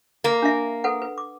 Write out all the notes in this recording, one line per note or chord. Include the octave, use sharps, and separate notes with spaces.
A#3
D4 E5
A4 B4 F#5
B4
D6